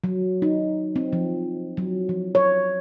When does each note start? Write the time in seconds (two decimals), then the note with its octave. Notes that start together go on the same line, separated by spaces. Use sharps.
0.04 F#3
0.42 D#4
0.96 C4
1.13 F3
1.77 F#3
2.09 F3
2.35 C#5